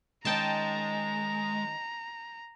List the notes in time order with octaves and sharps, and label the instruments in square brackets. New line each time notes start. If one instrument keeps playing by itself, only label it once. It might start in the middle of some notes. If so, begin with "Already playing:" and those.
[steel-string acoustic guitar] D#3 C#4 D#5 [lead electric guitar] G#3 [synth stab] G5 A5 [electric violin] A#5